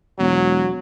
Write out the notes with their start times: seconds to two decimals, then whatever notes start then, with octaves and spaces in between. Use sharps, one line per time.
0.19 E1 F#3